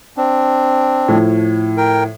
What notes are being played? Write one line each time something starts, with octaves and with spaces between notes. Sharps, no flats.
C4 D4
A2 F3
A#4 G5